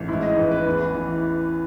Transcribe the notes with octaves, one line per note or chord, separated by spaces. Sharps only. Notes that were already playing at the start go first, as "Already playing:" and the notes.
Already playing: A1
G#2 E4
D#5
A1 B4
B4
E2
E3